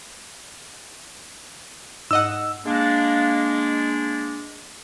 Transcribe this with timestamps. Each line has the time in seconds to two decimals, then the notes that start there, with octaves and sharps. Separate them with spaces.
2.11 G#2 D#5 F#5 E6
2.65 G#3 A#3 D4